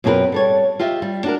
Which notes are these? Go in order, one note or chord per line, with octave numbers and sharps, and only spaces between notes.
F#2 B2 C4 G#4 A#4 B4
G3 A4 C#5
F4 G4 D#5 E5
G3
D4 F#4 A#4